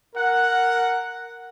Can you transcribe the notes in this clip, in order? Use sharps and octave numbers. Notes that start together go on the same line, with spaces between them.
A#4 F#5